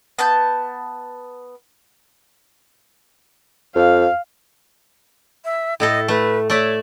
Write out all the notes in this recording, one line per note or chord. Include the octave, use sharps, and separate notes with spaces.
B3 A5 G6
F2 F5
E5
A2 E4 A4 D#5
A3 B4
A3 C#5 D5 E5